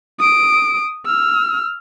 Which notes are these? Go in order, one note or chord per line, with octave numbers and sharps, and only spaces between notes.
D#6 D7
E6 F6